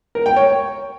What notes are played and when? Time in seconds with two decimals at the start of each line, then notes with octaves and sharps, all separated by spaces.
0.15 A#4
0.26 G5
0.36 C#5